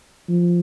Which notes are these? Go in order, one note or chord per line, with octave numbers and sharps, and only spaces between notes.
F3